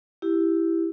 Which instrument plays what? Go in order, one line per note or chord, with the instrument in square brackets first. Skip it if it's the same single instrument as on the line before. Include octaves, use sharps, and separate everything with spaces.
[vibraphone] E4 G4